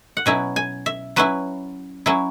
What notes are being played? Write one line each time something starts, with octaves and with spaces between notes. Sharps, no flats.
F#5
B2 F#3 C#4 E4 G#5
G#5
E5
F#3 C#4 E4 B4
F#3 C#4 E4